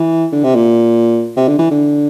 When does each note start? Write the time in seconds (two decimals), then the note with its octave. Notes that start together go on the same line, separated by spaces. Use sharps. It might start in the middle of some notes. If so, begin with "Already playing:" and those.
Already playing: E3
0.32 D3
0.44 C3
0.55 A#2
1.36 C3
1.48 D3
1.59 E3
1.71 D3